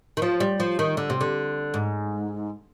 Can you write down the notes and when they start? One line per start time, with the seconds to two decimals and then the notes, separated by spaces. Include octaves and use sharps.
0.17 D#3
0.22 F3
0.40 G3
0.60 F3
0.79 D#3
0.97 D3
1.10 C3
1.21 D3
1.74 G#2